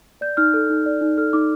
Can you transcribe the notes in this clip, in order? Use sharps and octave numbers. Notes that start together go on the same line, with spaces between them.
D5 G6
D#4 F6
A4
D#4
D5
D#4
A4 F6
D#4 D6